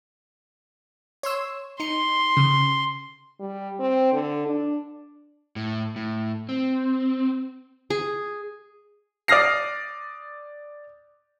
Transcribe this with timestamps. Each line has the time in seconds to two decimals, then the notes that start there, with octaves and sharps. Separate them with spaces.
1.23 C#5 C6 E6
1.80 D#4 C6 C#7
2.37 C#3
3.40 G3
3.79 C4
4.12 D3
4.46 D4
5.56 A2
5.96 A2
6.49 C4
7.90 G#4
9.28 D5 D#6 F6 A#6 C7